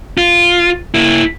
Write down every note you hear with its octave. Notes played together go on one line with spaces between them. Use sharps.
F4
A#3 E4